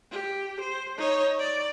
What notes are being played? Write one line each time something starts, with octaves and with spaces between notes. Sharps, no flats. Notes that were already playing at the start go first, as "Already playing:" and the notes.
G4
C5
D#4 C#5
D5